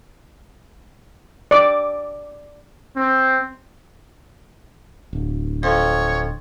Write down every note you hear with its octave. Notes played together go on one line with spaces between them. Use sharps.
D5 D6
C4
D1
F2 C#5